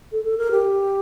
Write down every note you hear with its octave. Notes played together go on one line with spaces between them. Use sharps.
A4
A4
A#4
G4